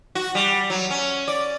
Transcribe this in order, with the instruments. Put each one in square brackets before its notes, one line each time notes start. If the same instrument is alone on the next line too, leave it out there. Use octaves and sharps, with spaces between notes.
[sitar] F#4
G3
F#3
C#4
D5